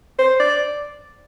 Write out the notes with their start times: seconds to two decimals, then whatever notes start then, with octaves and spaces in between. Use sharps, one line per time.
0.19 C5
0.40 D5